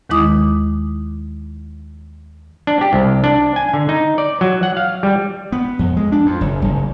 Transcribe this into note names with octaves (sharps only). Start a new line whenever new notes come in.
D#2 D#3 G#3 E4 D6 D#6
D4
G4
C2
D4
G#5
D3
D#4
D5
F#3
F#5
F5
G3
B3
F2
G#3
D4
F2
F#1
F#1